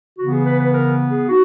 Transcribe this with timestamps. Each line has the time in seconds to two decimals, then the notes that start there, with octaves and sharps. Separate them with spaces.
0.18 C#3 E3 B3 F#4
0.32 G#4
0.46 B4
0.60 B4
0.73 A#4
1.11 G#4
1.29 D#4 F#4